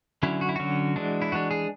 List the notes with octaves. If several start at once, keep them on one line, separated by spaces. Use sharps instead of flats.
D3 F#3 C#4 E4
F#4
E4
D3 F#3 C#4 F#4
E3 G#3 D4
E4
E3 G#3 D4 F#4
G#4